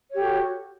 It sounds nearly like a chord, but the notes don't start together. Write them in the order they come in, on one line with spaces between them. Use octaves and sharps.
C#5 G4 A4 F#4